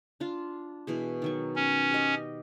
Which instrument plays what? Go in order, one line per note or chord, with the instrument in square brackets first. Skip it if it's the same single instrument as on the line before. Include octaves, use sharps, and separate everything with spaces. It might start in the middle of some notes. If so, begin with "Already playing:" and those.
[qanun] D4 F4
B2 E3 G#4
D#3 F#3 C#6
[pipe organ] C#4
[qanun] G4 D#5